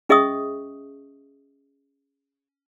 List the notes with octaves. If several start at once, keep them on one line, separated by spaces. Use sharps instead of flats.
C#4 G#4 D#5 E5 C#6 D#6